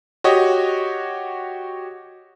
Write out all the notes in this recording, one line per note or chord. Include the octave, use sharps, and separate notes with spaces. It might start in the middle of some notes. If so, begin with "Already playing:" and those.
F#4 G4 C#5 D#5